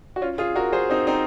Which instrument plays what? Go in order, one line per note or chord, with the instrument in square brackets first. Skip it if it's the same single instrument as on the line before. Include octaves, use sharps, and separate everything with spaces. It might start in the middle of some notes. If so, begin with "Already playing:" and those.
[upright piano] F#4
C#4 F4
F4 G#4
F#4 A#4
G#4 C5
C4 D#4
C4 D#4